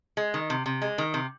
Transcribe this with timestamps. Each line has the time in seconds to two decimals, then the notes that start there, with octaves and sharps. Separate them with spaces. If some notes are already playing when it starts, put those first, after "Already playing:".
0.17 G#3
0.34 D#3
0.50 C3
0.66 C3
0.82 G#3
0.98 D#3
1.14 C3